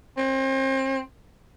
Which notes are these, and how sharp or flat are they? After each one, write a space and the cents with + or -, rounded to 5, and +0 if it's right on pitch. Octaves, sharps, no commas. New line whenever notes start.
C4 +35